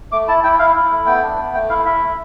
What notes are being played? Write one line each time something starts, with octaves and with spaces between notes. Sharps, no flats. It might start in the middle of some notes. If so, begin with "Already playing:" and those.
A3 D6
E4 A5
E4 G5
E4 F5
E4
A3
B3 G5
D4
B3
A3 G5
E4 F5
E4 E5
A3